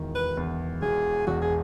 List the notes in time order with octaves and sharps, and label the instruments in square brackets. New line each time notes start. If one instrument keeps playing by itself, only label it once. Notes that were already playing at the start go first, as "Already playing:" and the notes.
Already playing: [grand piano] E1 D#3
[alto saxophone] B4
[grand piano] E2
[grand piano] E1 [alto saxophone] G#4
[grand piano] E1 [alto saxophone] F#4
[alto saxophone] G#4